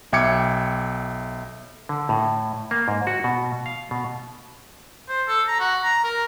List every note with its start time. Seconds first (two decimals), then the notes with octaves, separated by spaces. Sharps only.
0.13 B1 E5 G5 D6 G#6 C#7
1.89 D3
2.09 A2
2.71 A#3
2.88 G#2
3.07 F#4
3.24 B2
3.66 F5
3.91 B2
5.09 C5
5.28 A4
5.48 A#5
5.60 F#4
5.84 A#5
6.04 A#4